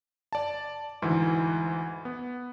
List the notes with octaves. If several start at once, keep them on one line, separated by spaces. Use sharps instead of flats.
D5 A5
D2 G#2 E3
B3